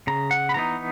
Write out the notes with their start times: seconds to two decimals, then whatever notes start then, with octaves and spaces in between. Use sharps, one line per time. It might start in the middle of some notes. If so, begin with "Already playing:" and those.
0.07 C#3 A#5
0.31 F#5
0.49 B5
0.54 E3 B3 D#4 A#5